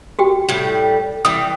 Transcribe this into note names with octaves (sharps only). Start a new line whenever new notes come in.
F#4 G4 G5
A2 G3
E3 G3 D#6